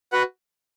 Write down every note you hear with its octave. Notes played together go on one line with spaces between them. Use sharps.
F#4 B4 F#5